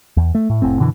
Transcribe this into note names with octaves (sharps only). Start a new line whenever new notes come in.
E2
A3
A2
F1 A2 C4
F#2 B2 D3 E3